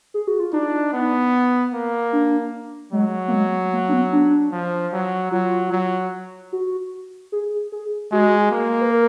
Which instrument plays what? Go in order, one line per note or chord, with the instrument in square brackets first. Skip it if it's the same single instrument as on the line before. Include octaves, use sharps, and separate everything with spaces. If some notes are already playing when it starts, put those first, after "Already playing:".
[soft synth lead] G#4
F#4
F4
[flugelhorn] D4 [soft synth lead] D#4
[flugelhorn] B3
A#3
[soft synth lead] D4
[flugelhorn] F#3 [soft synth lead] G#3
[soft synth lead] A#3
G#3
A#3
D4
B3
D4
[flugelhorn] F3
F#3
[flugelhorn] F#3 [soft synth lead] F4
[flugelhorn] F#3
[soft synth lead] F#4
G#4
G#4
[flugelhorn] G#3 [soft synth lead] F#4
[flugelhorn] A#3
[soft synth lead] B4
A#4